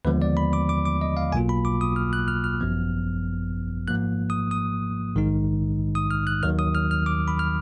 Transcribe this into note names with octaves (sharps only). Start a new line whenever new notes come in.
D#2 D3 F3 G#3 B3 B4
D5
B5
D6
D6
D6
D#5
F5
B1 B2 F#3 A#3 F4 G#5
B5
D6
D#6
F6
F#6
F6
F6
G#1 F#2 F3 B3
G#2 F3 A#3 F#6
D#6
D#6
A#1 G#2 D#3 G#3 D#4
D#6
F6
F#6
D#2 D#3 F#3 F6
D#6
F6
F6
D6
B5
F6